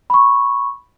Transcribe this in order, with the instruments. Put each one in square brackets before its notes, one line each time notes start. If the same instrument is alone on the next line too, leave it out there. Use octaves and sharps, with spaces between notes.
[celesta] B5 C#6